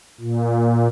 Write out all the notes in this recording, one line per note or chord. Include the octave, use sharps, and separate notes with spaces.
A#2